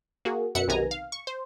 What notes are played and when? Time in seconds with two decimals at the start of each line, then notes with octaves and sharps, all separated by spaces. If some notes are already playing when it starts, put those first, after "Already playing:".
0.25 A#3 F#4 G#4
0.55 F#2 B2 E5 F#5 C#7
0.68 B1 C3 D#3 B3 G#5 A#5
0.91 F5
1.12 C#6
1.27 C5